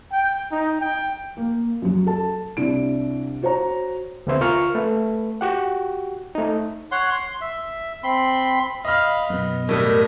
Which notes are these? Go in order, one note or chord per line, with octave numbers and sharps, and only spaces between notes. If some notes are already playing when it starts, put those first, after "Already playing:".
G5
D#4
G5
A#3
F#2 F#3
A4 A5
C2 D4 E4 D7
F#4 C5 C#5 A#5
D2 C3 A3 B3 C5 E5
F4 A#4 C#6 F6
A3 B4
F#4 G4 F#5
A3 D#4
C#5 F#5 C6
C6
E5
C4 B5 C6
D#5 F5 B5 F6
F#2 B2 B3
A2 G3 A3 A#4 D#5